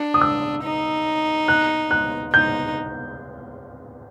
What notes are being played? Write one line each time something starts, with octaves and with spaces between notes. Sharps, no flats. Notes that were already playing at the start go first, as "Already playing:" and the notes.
Already playing: D4
D#6
E6
D#4
F#6
F#6
D#4 G6